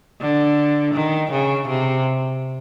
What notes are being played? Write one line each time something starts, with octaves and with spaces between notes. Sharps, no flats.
D3
D#3
C#3
C3